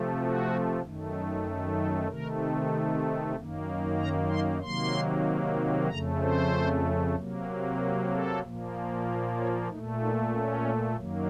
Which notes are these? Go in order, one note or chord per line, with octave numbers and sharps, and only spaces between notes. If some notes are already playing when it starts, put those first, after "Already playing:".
Already playing: C3 F3 A3
F#4
F#2 D#3 A3
A4
C3 D#3 A3 A#4
F#2 D#3 A#3
A#5
C6
C3 D#3 F#3 A#3 C6
F2 C#3 A3 A#5
C5
C3 F#3 A#3
A#4
A4
A#2 F3 A#3
A#4
C#5
A#2 A3 D#4
D#4
C#4
F#2 D#3 F#3 A#3